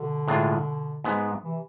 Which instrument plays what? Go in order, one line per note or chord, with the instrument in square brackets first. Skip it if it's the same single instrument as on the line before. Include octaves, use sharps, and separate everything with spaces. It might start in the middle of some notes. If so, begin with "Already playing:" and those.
Already playing: [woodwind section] B2 D3
[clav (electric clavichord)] A2 G#3 D4 F4
G#2 G#3 B3
[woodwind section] C3 E3